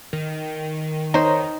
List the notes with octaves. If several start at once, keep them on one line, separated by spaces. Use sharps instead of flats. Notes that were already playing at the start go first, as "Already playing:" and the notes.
D#3
D#4 C5 C#5 A#5